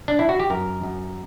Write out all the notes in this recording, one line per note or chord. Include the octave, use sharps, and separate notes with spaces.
D4
E4
F#4
G4
F#2 A#4
F#2